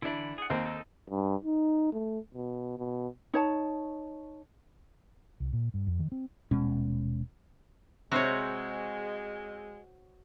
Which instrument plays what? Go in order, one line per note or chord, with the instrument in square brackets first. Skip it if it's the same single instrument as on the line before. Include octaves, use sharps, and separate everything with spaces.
[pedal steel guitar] D3 E3 B5 [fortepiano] D4 E4
[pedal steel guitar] G#4 F#5
[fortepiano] D#2 A#3 C4 [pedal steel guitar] C5
[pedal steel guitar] D#4 A4
[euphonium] G2
D#4
A3
B2
B2
[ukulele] D#4 C#5 A5
[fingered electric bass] C2
A#2
G2
F2
D#3
C4
[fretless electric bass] D#1 B2 G#3 C#4
[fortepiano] C3 [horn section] G#3 [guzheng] F#4 C5 C#5